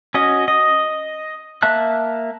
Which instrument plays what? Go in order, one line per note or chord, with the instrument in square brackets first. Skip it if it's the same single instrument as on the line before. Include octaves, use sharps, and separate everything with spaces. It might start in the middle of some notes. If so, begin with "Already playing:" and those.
[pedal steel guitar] C#4 F#4 D#5
D#5
A#3 E5 A5 F#6